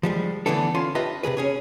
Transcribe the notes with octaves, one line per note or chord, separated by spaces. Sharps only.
F3 G3 G#3
D3 E3 A3 B3 D4 A4
C#4 F4 G#5 C6
D4 F4 G4 B4 D#5 E5
C3 D#3 G#4 B4
C#4 G#4 C#5